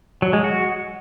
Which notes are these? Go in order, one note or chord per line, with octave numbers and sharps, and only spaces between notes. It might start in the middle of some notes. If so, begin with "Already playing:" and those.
F#3
G#3
F#4